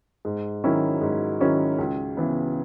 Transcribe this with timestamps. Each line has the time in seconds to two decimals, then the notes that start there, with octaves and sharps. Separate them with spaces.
0.25 G#2
0.64 D#3 F#3 C#4 E4
1.01 G#2
1.40 D#3 F#3 C#4 E4
1.78 C#2
2.17 C#3 E3 B3